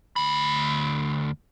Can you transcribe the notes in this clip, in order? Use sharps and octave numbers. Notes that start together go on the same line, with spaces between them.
D2 B5